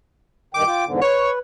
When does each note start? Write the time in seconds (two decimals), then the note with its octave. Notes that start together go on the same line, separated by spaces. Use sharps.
0.54 G2 D#3 G5 D6
0.67 F4 G5
0.85 E2 G#2 D3
1.01 B4 C#5